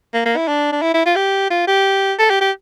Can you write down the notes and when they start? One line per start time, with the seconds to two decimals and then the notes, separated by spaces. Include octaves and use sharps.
0.14 A#3
0.25 A#3
0.37 E4
0.48 D4
0.72 D4
0.82 E4
0.94 E4
1.06 F4
1.16 G4
1.50 F4
1.68 G4
2.19 A4
2.30 G4
2.41 G4